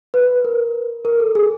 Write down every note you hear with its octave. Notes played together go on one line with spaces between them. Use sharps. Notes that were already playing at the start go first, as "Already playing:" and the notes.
B4
A#4
A#4
A4
G#4